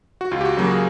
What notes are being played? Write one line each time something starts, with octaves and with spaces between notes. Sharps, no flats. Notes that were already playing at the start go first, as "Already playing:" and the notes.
F#4
C#2 F4
G4
F#4
C#3 F#3 A#3 G4
G#4